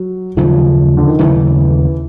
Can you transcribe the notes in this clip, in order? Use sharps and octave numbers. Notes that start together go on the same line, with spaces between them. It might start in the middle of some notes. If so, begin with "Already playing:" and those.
Already playing: F#3
D#2 C#3 F3 F#3 A3
D3
D#3
D#2 C#3 E3 F#3 A3